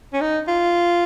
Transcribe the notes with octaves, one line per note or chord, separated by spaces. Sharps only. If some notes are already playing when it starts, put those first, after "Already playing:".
C#4
D#4
F4